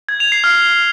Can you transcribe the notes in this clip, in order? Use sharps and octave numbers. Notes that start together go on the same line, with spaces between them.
G#6
F7
C7
F6